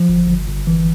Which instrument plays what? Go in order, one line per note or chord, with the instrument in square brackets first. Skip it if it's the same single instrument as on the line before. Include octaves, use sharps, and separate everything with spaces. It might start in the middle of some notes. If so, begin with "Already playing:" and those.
Already playing: [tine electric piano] F3
G1
G1
G1
E3